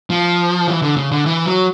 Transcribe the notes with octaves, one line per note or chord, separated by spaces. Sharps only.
F3
E3
D3
C#3
D3
E3
F#3